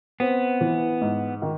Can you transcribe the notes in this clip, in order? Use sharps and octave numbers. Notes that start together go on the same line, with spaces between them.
B3 C4
E3
G#2
D#3